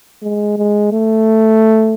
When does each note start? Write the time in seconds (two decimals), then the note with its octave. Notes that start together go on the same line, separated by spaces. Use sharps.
0.22 G#3
0.58 G#3
0.93 A3